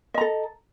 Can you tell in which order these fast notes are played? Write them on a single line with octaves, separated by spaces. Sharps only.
D#5 A#5 A4